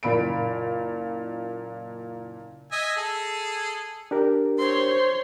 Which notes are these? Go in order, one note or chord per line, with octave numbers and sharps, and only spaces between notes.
F#1 A#2 B5 D7
D#5 E5 G#5
G#4 A4
D4 G4 A#4
C5 C#5 C6